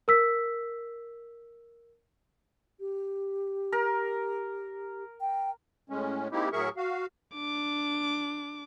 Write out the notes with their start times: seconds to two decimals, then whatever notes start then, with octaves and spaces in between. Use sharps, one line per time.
0.08 A#4 E6 B6
2.80 G4
3.72 A#4
5.21 G5
5.90 A2 G#3 C#4
6.32 G#3 A#3 C4 D#4 E4 G4
6.52 A2 F#3 G#4 A#4 E5 C#6
6.77 F#4 F5
7.36 D4 D6